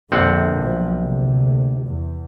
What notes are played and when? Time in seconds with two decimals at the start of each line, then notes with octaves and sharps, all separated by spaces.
0.12 A#1 F2 B2 D3 C4 F#5
0.62 B1 F3
0.98 D2 C3
1.86 E2